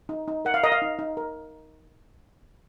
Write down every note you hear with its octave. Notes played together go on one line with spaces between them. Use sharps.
D#4
D#4
A#4 F#5
F5
A#4 D#5
F5
D#4
D#4
A#4